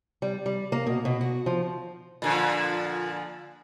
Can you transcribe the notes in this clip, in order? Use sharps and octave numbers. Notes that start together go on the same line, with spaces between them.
G3
G3
A#3
B2
B2
F#4
F3
A#2 D3 F3